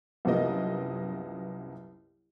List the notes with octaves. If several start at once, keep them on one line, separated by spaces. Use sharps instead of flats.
C2 F#2 F3 A#3 B3 D#5